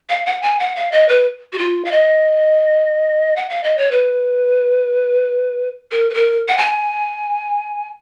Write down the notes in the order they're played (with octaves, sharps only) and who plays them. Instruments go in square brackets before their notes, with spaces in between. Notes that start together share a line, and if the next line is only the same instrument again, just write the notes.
[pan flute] F5
F#5
G#5
F#5
F5
D#5
B4
F#4
F4
F5
D#5
F#5
F5
D#5
C#5
B4
A#4
B4
A#4
F#5
G#5